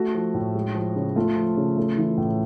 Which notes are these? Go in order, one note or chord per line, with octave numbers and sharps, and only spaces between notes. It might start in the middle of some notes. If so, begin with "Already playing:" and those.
Already playing: A3 F#4
F3
A2
G#3
F3
C#3
A3 F4
F3
C#3
A3
E3
A2